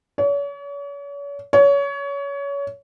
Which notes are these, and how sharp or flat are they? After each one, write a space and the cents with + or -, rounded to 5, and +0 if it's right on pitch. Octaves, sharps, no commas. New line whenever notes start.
C#5 +40
C#5 +25